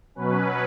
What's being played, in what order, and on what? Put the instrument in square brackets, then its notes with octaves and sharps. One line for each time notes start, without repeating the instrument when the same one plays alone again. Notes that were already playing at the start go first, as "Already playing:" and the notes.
[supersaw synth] B2 F#3 C#4 B4